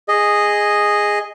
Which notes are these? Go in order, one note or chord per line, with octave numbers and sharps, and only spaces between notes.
G#4 D#5